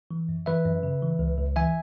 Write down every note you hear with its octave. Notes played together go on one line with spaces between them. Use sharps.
E3
F#2
E3 B4 E5
F#2
C#3
E3
C#2
C#2
E3 E5 G#5